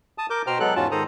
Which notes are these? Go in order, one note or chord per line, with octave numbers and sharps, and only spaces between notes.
A5 D#6
A#4 D6 G6
B2 C5 G5 A#5 F6
F#3 G#3 B3 A4 F#6
E2 G#2 C#4 F4 F#4 A5
G#2 D#3 A4 C5 A#5 D#6